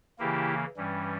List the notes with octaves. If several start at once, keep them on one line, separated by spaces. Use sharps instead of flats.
C#3 E3 A#3 E4 G4
G2 E3 G3 C#4